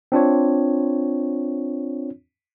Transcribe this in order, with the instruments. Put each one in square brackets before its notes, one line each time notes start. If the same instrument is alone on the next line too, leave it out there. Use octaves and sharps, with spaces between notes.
[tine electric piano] C4 D4 F4 C#5